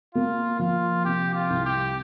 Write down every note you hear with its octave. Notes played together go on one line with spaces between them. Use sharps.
A#3 F4
F3 F4
C3 G4
F4
C2
G4